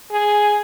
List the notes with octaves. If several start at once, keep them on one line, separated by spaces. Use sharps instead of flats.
G#4